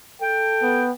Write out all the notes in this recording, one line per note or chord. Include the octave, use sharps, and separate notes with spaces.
A4 G5
B3